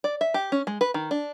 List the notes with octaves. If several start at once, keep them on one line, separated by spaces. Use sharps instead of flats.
D5
E5
G4
C#4
G#3
B4
D#3
D4